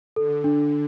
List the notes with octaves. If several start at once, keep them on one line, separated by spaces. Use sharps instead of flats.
D3 A4
D4